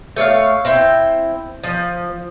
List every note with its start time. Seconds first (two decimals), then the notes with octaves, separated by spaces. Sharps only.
0.16 A3 C#5 D5 F5
0.65 C4 E4 G5
1.64 F3